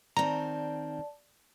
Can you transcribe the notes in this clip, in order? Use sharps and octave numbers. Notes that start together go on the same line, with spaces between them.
D#3 C4 D5 A5 A#5